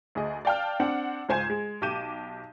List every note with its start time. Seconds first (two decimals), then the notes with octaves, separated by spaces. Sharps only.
0.15 D2 G#4 D#5
0.45 D5 F5 G5 A5 F6
0.80 C4 D4 F#5
1.29 C#2 G#2 C5 G#5 G#6 E7
1.50 G#3
1.81 B1 G4 D6 G6 D#7 E7